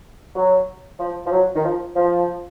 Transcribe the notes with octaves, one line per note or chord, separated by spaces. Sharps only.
F#3
F3
F3
F#3
D#3
F3
F3